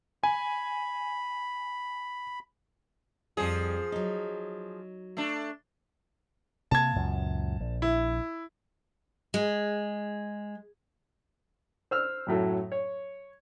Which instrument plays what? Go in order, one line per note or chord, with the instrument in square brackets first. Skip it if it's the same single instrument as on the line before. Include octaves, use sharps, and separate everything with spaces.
[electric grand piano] G#5 [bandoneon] B5
[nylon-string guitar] F2 G3 [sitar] F3 G#4
[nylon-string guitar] F#3 D#4
[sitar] A3 D4
[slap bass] C3 A#3 [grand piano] A5 G#6
[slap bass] C#2 F#2 A#2
A#1
[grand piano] E4
[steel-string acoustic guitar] G#3
[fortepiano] C5 E6 F6
F#2 A2 F#3 A4
C#5